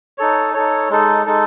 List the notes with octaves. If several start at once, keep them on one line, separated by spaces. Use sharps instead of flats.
D#4 A4 C#5
D#4 A4 C#5
G#3 D#4 A4
G#3 D#4 A4